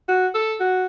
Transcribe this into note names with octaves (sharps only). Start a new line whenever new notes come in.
F#4
A4
F#4